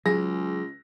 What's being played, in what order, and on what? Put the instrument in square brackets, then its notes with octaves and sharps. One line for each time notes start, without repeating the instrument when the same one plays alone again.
[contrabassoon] C#2 [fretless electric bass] F#3 [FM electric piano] G#4 [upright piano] A#6